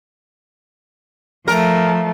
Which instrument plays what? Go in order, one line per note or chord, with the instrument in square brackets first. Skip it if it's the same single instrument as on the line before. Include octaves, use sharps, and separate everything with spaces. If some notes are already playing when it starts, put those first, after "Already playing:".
[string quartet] F3 A3 [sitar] A#4